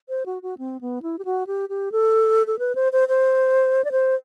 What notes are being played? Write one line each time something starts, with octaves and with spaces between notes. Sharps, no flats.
C5
F#4
F#4
C4
B3
E4
G4
F#4
G4
G4
A4
A4
B4
C5
C5
C5
D5
C5